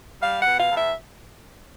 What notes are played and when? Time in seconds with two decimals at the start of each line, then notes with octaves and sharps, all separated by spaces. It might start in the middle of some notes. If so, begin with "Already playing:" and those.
0.22 G3 F5
0.41 F#5
0.47 B2
0.59 F5
0.72 E2
0.77 E5